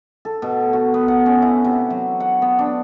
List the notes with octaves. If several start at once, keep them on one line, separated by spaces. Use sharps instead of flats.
A4
B2
F#4
B3
F#5
C#4
E4
C3
F#3
F#5
B3
D4